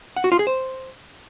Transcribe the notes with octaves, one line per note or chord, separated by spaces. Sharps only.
F#5
F#4
F4
G#4
C5